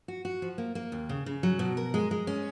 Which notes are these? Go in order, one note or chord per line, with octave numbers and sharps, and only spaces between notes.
F#4
F#4
F3
A#3
A#3
D#2
C#3
C#3
F#3
B2
A#4
G#3
G#3
C#4